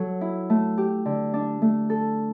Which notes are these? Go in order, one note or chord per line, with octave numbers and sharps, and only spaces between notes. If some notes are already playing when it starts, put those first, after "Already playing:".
Already playing: F#3 F#4 A4
E4
A3
G4
D3
D4
A3
A4